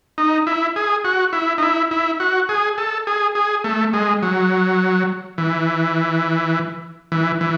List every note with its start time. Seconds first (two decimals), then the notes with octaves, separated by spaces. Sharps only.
0.18 D#4
0.47 E4
0.76 G#4
1.05 F#4
1.33 E4
1.58 D#4
1.62 E4
1.91 E4
2.20 F#4
2.49 G#4
2.78 A4
3.07 G#4
3.35 G#4
3.64 A3
3.93 G#3
4.23 F#3
5.38 E3
7.12 E3
7.41 E3